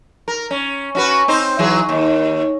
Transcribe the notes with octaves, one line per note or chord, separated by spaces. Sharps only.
A#4
C#4
C#4 F#4 B4
C4 D#4 C5
E3 F#3 G#4
D#2